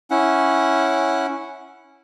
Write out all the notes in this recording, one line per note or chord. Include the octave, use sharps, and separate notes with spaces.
C#4 E4 F#5